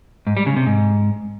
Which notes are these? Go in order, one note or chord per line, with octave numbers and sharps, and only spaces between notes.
G#2
G3
C#3
C3
G#2